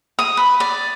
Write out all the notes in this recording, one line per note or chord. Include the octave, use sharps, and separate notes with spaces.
D#6
B4
D5